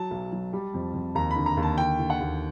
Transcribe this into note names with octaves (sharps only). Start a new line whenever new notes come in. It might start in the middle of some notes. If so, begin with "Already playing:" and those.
Already playing: F#3 A5
B1
F#3
G3
F2
F2
D#2 A#5
B5
D3
A#5
D#2
A5
D3 G5
D3
F#5
D#2